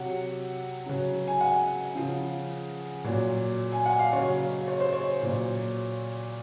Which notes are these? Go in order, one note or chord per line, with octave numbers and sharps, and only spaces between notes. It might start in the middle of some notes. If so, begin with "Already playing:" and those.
Already playing: C3 F#3 F#5
C#3 F#3
G#5
F#5
C#3 F3
A#2 F#3
G#5
F#5
F5
C#3 F#3 C#5
C#5
C5
C#5
A#2 F#3